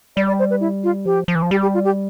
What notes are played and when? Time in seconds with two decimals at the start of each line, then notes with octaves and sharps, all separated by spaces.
0.16 G3 D5
0.27 D5
0.39 C5
0.51 B4
0.61 E4
0.84 F4
1.06 F3 G4
1.28 F3
1.35 E3
1.42 F3
1.51 G3 G4
1.62 G4
1.74 F4
1.85 G4